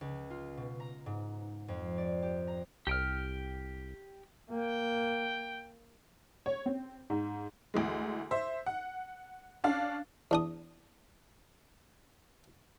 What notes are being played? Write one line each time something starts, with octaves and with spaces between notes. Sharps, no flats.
C#2
F4
B2
A#5
G#2
F2
D5
G4
A#5
C2 G4 G5 F6
A#3 G5
C#5
C4
G#2
D2 E3 G#3
C5 E5
F#5
C#4 D4 F5
E2 D4 D#6